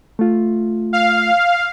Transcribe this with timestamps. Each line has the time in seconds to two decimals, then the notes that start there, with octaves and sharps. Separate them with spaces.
0.19 A3 F4
0.93 F5